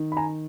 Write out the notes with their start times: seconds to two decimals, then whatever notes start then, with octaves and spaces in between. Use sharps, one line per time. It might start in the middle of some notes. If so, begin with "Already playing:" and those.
Already playing: D#3
0.12 B5
0.17 G#5 A#5